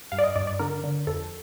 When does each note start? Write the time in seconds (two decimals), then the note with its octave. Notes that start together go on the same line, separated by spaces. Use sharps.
0.12 G2 F5
0.18 D5
0.24 D#5
0.36 G2 D5
0.47 D5
0.59 D3 A#4
0.84 D3
1.07 F2 A4